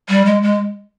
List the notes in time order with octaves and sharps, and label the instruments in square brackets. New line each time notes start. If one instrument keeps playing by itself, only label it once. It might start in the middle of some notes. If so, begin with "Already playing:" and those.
[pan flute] G3
G#3
G#3